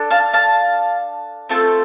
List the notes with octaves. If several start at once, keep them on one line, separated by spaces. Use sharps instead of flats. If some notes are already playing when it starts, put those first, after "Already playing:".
Already playing: D4 A4
F5 A5
F5 A5
A3 C4 F4 A4